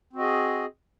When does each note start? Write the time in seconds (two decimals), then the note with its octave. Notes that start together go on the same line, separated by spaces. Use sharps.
0.13 C4
0.16 F#4
0.18 D#5
0.21 G#4